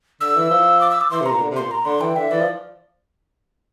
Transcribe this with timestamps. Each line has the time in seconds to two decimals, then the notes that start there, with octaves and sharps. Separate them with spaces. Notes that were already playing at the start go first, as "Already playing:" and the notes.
0.21 D3 E6
0.36 E3
0.51 F3
0.81 D6
0.90 E6
1.01 D6
1.11 E3 C6
1.21 C3
1.26 A#5
1.31 A#2
1.41 D3
1.51 C3
1.56 A#2 C6
1.71 A#5
1.85 D3 C6
2.01 E3 G5
2.16 D3 E5
2.31 E3 D5
2.41 F3